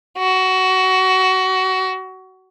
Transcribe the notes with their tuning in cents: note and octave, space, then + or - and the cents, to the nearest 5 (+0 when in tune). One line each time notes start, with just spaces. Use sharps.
F#4 +20